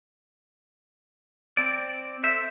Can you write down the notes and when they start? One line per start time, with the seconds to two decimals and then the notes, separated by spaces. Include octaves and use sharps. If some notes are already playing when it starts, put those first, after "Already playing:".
1.57 C4 D5
2.23 A4 C5 E5